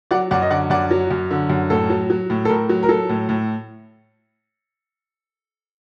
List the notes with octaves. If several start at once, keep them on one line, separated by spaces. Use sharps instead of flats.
F#3 D5 F#5
F#2 D5 F#5
D#5
D3 D5 F#5
F#2 D5 F#5
F#3
F#2
D3
F#2
A2 A4
F#3
F#3
A2
A4
A2 A#4
F#3
A#4
F#3 A4
A2
A2